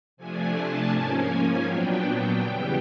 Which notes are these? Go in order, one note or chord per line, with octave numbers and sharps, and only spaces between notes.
C3 F3 A3 D4 G#5
A5
G#2 F3 A#3 C#4 G#5
A#2 F#3 B3 D4 G5
E2 C#3 E3 G3 B3